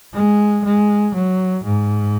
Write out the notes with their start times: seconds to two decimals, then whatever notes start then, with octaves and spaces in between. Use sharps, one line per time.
0.13 G#3
0.64 G#3
1.15 F#3
1.64 G#2